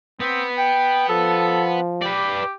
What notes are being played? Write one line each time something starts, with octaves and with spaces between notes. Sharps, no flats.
B3 C4
G5
F3 A4
G4 B4 D5